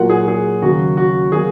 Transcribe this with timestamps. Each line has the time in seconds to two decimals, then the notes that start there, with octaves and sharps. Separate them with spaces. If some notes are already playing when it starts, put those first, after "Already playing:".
Already playing: A#2 F#3 A#3 F4 A#4 F#5
0.10 G#4
0.28 G#4
0.62 D#2 C#3 F#3 F#4
0.97 F#4
1.32 C#3 F#3 A#3 C#4 G#4